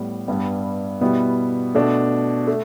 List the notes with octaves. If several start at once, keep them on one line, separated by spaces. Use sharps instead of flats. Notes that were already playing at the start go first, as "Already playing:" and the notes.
Already playing: A2 G3 B3
G2 G3 B3
B2 G3 B3 E4
B2 A3 D4
A3